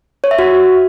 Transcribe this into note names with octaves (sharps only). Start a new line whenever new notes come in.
C#5
E5
F#4